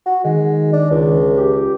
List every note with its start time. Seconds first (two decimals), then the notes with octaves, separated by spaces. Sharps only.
0.06 F#4
0.25 D#3 G#3
0.73 D4
0.91 C#2
1.37 G4